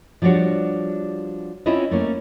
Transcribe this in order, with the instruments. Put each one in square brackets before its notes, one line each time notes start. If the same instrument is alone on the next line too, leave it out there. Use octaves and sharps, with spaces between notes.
[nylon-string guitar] F3 G3 D4 F#4 C#5
C4 C#4 E4 F4 C#5 D#5
A3 A#3 C#4